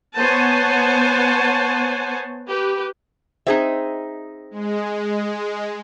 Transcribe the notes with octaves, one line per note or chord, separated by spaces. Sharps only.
B3 C5 C#5 F#5 G#5 A5
G4 B4
C4 D#4 G#4 E5
G#3